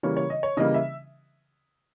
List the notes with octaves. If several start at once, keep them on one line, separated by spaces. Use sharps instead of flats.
C#3 E3 G3 A#3 C#5
C#5
D#5
C#5
C#3 E3 G3 A#3 D#5
E5